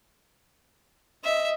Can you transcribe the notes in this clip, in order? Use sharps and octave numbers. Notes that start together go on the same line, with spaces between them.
D#5 E5